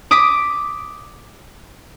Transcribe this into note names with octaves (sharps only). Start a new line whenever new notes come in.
D6 D#6 B6